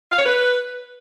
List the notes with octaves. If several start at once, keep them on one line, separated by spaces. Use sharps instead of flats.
F5
C#5
B4